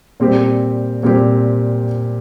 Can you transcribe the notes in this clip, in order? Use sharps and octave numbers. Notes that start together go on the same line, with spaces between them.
A#2 G3 C4 G4
A#2 G3 C4 G4